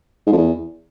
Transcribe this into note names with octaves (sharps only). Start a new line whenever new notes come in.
G#2
F2
E2